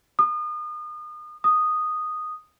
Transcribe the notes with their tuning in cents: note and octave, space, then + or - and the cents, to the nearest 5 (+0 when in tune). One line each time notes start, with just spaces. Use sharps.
D#6 -35
D#6 -10